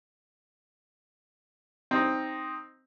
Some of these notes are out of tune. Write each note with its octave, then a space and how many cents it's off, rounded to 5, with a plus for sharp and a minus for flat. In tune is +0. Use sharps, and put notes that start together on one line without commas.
C4 +0 D#4 +0